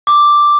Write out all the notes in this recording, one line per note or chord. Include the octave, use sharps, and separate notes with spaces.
D6